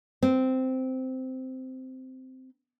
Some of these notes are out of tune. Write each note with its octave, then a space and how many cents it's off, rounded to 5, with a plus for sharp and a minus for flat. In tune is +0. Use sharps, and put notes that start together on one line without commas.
C4 -10